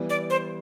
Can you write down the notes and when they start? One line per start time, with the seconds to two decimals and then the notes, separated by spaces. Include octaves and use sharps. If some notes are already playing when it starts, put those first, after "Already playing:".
Already playing: E3 G3 B3 E4
0.09 D5
0.30 C5